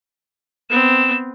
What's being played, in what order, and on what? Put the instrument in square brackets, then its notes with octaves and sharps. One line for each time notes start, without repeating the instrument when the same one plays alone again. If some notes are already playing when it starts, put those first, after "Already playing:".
[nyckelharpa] B3 C4 [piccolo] E7